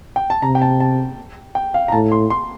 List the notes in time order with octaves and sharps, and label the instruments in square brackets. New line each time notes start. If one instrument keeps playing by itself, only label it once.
[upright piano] G5
A5
[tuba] C3 [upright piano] A#5
[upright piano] G5
A5
A5
G5
F5
A#5
[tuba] A2 [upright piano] A5
[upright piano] C6
C6